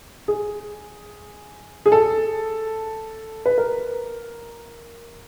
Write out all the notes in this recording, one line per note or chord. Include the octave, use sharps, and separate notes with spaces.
G#4
G#4
A4
B4
A#4